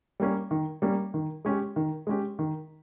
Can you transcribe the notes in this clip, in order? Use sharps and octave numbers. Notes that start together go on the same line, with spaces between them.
G3 A#3 C#4
D#3
G3 A#3 C#4
D#3
G#3 C#4 G4
D#3
G#3 C#4 G4
D#3